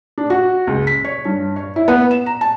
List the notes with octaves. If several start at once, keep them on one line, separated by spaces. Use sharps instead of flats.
D4
F#4
C#2
B6
C#5
G2
C#5
E4
B3
E7
A#5
A5